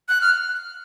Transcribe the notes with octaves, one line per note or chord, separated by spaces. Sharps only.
F#6
F6